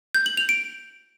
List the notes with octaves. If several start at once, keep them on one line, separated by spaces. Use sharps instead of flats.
G6
F#7
F7
D7